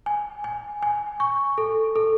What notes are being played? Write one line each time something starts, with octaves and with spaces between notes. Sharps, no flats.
G#5
G#5
G#5
C#6
A4
A4